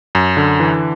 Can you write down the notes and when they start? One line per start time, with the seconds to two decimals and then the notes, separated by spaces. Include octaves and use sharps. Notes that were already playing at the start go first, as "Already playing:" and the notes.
0.15 F#2
0.37 D3
0.60 E3